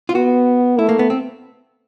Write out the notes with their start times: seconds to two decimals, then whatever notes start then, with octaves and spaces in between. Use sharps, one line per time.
0.09 F4
0.15 B3 F#4
0.79 A3 E4
0.89 A#3
0.99 B3
1.10 C4